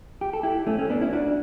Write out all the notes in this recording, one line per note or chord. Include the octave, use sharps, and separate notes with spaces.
G4
A4
E4 G4
A3 C#4
A3 C#4
B3 D4
C#4 E4
D4 F#4